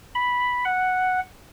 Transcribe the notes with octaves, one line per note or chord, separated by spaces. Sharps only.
B5
F#5